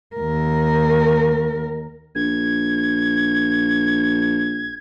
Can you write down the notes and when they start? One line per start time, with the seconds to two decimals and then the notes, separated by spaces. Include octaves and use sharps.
0.16 D#2 A#4
2.15 A#1 G#6